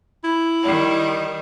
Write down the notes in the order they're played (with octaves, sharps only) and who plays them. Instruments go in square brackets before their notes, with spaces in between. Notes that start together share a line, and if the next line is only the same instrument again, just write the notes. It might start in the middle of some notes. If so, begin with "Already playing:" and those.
[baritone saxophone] E4
[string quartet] D#3 G3